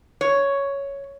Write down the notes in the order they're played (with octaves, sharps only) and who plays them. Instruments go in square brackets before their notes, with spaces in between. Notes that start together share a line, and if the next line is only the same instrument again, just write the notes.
[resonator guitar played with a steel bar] C#5